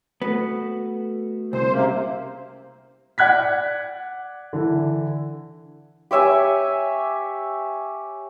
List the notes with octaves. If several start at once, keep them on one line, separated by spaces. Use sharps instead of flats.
A3 B3 F#4 A4
C2 C5
C3 A#3 C#4 G4 G#4
D5 F#5 F#6 G#6 B6
D3 E3
G4 C#5 E5 G#5